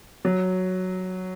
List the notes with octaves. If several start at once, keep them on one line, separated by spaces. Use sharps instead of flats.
F#3